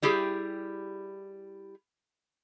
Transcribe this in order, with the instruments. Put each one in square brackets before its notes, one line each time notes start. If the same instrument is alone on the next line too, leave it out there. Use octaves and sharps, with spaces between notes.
[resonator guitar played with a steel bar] G3 E4 G4 G#4